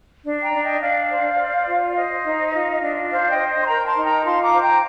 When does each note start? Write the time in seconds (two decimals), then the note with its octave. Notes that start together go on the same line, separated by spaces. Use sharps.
0.24 D4
0.43 G5 A#5
0.53 D4
0.62 D#5 G5
0.81 D4 D5 F5
1.10 C5
1.39 C5
1.67 F4
1.88 D5
1.96 C5 D#5
2.25 D#4
2.53 F4
2.82 D4
3.10 C5 D5 F5
3.29 D#5 G5
3.38 C5
3.48 D#5
3.61 C6
3.66 A#4 G5 A#5
3.86 A5 C6
3.96 D#4
4.04 G5 A#5
4.24 F4 A5 C6
4.42 A#5 D6
4.53 C5
4.61 G5 A#5